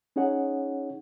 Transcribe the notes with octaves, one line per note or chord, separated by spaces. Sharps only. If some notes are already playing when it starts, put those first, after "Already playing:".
C#4 D#4 G#4 C#5 F#5